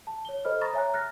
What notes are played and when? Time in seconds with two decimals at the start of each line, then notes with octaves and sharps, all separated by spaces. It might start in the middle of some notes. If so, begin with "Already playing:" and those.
0.07 A5
0.25 C#5 G7
0.45 A4 C5 D#5 B5 F6
0.61 A#5 B5 C#6 D#6 A6 A#6
0.74 C#5 E5 G#5 A#5 F#6
0.93 F6 F#6 A6 A#6